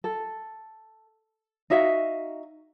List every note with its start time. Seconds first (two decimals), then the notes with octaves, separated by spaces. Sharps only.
0.04 A4
1.70 D#4 F#4 E5 F5